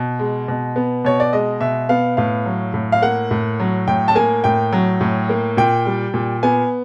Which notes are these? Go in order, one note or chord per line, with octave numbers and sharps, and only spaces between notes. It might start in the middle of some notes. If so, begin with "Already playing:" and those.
Already playing: B2
G#3
B2
B3
B2 C#5
D5
G#3 D#5
B2 E5
B3 F5
A2 F5
F#3
A2
F5
A#3 F#5
A2
F#3
A2 G5
A5
A#3 G#5
A2 G5
F#3
A2
A#3
A#2 G5
G3
A#2
B3 G#5